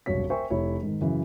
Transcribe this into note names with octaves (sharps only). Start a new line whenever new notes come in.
E1 C2 G2 F#3 C#5 B6
A#4 C5 E5 G5 G#5 C#6
F1 E4 C#5
G#2 D#3
F#2 C#3 E3